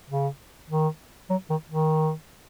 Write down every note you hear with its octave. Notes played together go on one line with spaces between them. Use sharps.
C#3
D#3
F#3
D#3
D#3